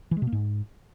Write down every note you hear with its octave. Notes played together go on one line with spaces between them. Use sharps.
E3
G#3
B2
A#3
G#2